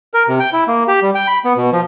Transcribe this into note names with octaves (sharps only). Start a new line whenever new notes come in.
A#4
C3
G5
E4
A#3
G4
G3
G5
B5
B3
B2
F3